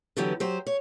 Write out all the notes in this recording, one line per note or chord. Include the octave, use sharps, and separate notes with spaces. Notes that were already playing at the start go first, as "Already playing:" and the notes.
D3 E3 F#3 B3 G4
F#3 G4 C5
C#5